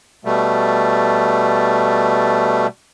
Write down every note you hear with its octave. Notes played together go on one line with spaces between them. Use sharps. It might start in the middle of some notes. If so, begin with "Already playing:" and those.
B2 G3 A3